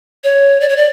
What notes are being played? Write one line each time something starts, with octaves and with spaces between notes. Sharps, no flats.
C#5
D5
C#5
D5